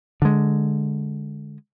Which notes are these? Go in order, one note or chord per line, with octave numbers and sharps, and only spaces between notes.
D3 G#3